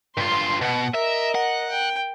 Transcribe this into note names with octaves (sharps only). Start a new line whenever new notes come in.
G2 F4 C6
B2 F#5
A#4 D#5 E5
F#5
G5